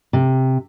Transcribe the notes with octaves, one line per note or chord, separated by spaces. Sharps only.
C3